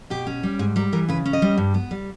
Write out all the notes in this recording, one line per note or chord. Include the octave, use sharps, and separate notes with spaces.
B2 G4
C#4
G3
G#2 G#4
G3 A#4
E3 A#4
C#3 B4
C#4
D#5
G3
G2
B3
G3